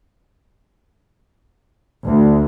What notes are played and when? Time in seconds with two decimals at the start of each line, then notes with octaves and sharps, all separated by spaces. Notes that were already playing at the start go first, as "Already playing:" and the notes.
2.06 D2